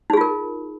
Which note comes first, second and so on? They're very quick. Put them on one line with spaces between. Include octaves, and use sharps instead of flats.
D#4 G#4 F4 A#4